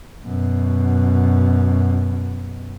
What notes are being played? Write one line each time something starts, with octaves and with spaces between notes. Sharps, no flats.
F#2 B2